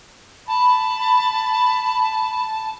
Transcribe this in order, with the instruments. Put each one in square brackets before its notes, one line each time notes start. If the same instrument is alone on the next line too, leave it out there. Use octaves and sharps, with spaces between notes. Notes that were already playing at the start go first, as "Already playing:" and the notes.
[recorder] A5 [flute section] B5